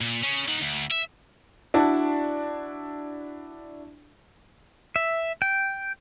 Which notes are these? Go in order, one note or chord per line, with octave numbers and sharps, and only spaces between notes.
A#2
C#4 G#4
D#4 F#5
D2
E5
D4 E4 F#4 A5
E5
G5